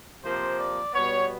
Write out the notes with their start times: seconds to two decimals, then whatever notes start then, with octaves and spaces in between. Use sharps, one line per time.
0.23 C3 F3 A#3 C5
0.58 D5
0.93 B2 G3 B3 C#5